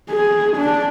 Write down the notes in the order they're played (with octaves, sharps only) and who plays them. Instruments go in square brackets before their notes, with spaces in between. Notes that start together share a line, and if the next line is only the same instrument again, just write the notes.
[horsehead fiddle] G#4
D4